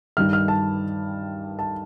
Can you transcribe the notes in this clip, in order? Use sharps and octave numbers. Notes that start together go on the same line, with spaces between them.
G2 D#3 G3 F6
F6
A5
A5